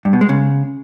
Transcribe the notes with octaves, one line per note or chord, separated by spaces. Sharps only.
G2
B2
G#3
C#3